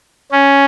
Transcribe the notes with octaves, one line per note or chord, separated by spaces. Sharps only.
C#4